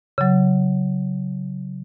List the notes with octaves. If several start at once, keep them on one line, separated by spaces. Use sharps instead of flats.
C#3 F#3